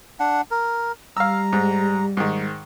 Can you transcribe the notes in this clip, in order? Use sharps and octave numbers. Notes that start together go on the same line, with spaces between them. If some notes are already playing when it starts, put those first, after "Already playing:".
D4 F#5
A#4
G3 F5 A#5 E6
G#2
G#2 D#3